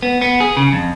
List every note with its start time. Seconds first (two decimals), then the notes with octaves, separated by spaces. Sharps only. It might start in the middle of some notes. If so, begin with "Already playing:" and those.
0.02 B3
0.21 B3
0.40 G#4
0.57 C#3
0.72 F2